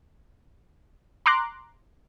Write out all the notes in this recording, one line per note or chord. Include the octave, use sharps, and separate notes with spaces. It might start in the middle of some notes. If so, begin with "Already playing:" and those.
A#5 C6 D6 F#6